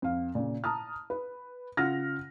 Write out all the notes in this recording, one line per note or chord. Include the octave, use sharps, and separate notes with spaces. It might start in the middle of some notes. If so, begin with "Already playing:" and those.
F2 F5
A#2 C#3
A5 A#5 D#6 F6
B4
C#3 F4 F#5 F6 A#6